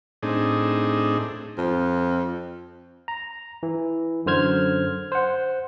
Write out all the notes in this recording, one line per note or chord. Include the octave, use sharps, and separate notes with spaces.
A2 C4 D4 D#4 G#4
F2
A#5
E3
F#2 D3 C5 F6 G#6
C5 F#5